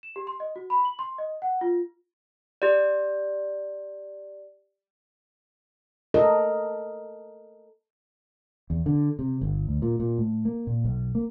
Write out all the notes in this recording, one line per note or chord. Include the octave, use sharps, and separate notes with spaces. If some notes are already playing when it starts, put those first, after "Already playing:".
E7
G4
C6
D#5
F#4
B5
F#7
C6
D#5
F#5
F4
G4 D5
A4 A#4 D#5
E2
D3
C3
G1
D2
A#2
A#2
A2
A#3
A#2
B1
A#3